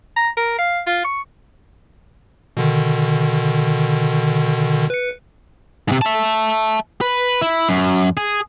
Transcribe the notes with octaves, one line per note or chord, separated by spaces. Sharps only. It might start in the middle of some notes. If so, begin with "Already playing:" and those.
A#5
A#4
F5
F4
C#6
B2 D3 D#3
B4 C#7
G#2 C3
E5 A5
B4
E4
F#2
G#4